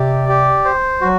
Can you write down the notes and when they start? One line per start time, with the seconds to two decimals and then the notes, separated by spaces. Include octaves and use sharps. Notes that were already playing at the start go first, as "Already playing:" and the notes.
Already playing: C3 G4 D5
0.29 G4
0.65 C5
1.01 F#3 F#4